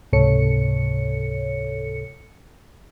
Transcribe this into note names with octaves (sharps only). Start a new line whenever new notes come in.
C#2 G#2 C3 A4 C#5 C#7